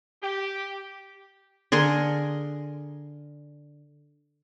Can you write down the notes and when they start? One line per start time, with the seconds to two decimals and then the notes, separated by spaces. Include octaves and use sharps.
0.22 G4
1.72 D3 G#4 A#4 C6